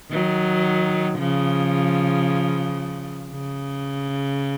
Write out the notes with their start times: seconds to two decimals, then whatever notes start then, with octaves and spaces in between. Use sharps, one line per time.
0.11 D#3 F#3
1.18 C#3 F3
3.32 C#3